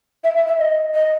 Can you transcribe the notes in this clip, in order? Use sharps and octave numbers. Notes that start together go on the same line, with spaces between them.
E5
E5
E5
D#5
D#5